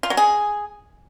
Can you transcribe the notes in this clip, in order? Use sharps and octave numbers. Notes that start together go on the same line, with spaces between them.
F4
F#3
G#4